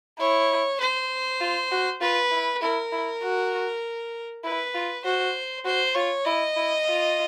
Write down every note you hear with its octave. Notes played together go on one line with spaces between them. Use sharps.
E4 C#5
C5
F4
F#4
F4 B4
E4
E4 A#4
E4
F#4
E4 B4
F4
F#4 C5
F#4 C5
F4 C#5
E4 D#5
E4
F4